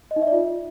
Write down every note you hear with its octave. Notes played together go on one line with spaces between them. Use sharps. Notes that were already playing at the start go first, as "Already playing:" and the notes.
D#5
D#4
E5
D5
F4